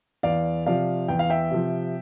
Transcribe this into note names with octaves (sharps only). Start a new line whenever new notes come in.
E2 D5 F5
C3 F3 D5 F5
E2 G5
F5
E5 G5
C3 F3